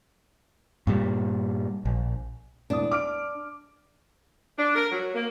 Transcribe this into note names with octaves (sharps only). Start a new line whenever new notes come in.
G2 A#2 G3
A#1
E1 A2 D4 D#6
D6 F6 D7
D4
A#4
F#3
A#3